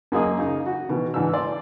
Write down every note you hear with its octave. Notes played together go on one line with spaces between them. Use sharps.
F#2 A#3 G#4 D#5 D#6
C#3 D#4
F#4
B2 D#3 E3
G#2 E3 D4 E6
D5 C6